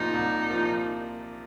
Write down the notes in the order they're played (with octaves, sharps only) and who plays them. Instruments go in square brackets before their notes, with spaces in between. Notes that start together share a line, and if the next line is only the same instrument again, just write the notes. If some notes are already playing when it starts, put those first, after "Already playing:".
Already playing: [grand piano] C2 A#2 F3 A#3 F4 [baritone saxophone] D#4
[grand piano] C2
A#2 F3 A#3 F4